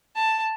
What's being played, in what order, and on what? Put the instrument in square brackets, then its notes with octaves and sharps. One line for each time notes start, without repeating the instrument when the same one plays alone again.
[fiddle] A5